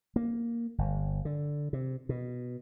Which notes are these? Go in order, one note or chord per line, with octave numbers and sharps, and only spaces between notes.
A#3
G1
D3
C3
B2